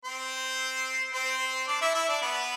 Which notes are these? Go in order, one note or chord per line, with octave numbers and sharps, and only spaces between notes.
C4 C5
C4 C5
D4 D5
E4 E5
E4 E5
D4 D5
B3 B4